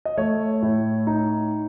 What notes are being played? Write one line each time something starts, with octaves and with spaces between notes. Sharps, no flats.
D#5
A3 C#5
A2
D#4